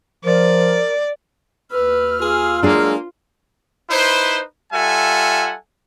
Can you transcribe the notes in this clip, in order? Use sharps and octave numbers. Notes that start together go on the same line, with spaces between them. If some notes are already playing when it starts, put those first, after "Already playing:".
F3 A#4 D5
D#2 B4 E6 F6
F4 G#4 F5
F#3 G#3 A#3 D4 G#4
D#4 E4 B4 C5
G3 F4 A4 E5 F#5 G#5